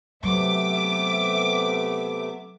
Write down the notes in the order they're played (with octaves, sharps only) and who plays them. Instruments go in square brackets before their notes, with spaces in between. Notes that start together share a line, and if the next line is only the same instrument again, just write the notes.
[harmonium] C3 A3 B3 [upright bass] F#3 [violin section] E5 D6